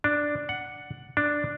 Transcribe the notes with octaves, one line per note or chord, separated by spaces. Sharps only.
D4
F#5
D4